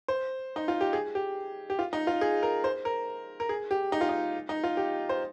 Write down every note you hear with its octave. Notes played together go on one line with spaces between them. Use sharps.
C5
D#4
F4
G4
G#4
G4
G4
F4
D#4
F4
G#4
A#4
C5
A#4
A#4
G#4
G4
D#4
F4
D#4
D#4
F4
G4
C5